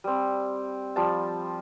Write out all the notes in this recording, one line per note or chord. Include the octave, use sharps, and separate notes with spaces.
G3 C4
F3 G3 A5